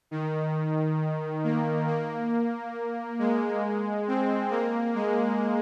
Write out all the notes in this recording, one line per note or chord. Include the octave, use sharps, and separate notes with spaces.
D#3
A#3
A#3
G#3
C4
A#3
G#3